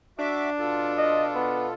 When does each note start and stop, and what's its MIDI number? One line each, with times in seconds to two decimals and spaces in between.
0.19 1.75 62
0.19 0.50 66
0.19 0.50 76
0.19 0.50 86
0.59 1.74 47
0.59 1.74 65
0.59 1.74 69
0.97 1.25 75
1.35 1.69 59